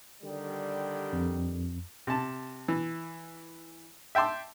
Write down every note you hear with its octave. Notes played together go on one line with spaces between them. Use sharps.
D3 D#3 G3
F2
C3 A5
E3
E5 G5 A5 C6 D6